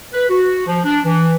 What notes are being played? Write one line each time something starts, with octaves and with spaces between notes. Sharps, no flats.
B4
F#4
F3
D4
E3